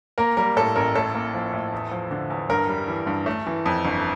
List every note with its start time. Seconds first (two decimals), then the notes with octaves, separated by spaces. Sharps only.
0.18 A#3 A#4
0.37 G3 A#4
0.57 A2 A4
0.76 A1 A#4
0.95 A2 A4
1.14 A#3
1.34 F3
1.53 A2
1.72 E2
1.91 F3
2.11 D3
2.30 E2
2.49 G2 A#4
2.69 G3
2.88 E3
3.07 G2
3.26 A3
3.46 E3
3.66 F2
3.85 G1